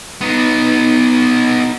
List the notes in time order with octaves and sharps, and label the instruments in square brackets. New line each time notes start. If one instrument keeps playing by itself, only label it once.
[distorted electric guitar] B3 D#4